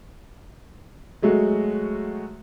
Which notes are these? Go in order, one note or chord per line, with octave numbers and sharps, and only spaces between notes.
F#3 G#3 A3 F#4